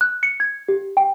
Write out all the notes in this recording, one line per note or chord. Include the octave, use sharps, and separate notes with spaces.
F#6
C#7
G#6
G4
G5